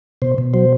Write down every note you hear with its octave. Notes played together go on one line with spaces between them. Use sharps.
B2 C5
B2
F#3 C5